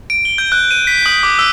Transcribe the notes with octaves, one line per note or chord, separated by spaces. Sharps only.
D7
G7
G6
F#6
D#7
B6
D#6
D6
E6